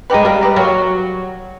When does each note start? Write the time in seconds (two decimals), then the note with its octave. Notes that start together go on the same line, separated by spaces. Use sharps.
0.10 G#3 D#4 G4 B4
0.25 G3 A#3
0.41 D#4 G4 B4
0.56 F#3 A#3